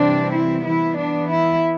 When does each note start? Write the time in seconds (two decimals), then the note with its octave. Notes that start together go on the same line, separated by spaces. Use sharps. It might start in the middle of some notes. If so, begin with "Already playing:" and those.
Already playing: C3 E3 G3 C4 D4
0.34 E4
0.66 E3 B3 E4
0.98 D4
1.30 E4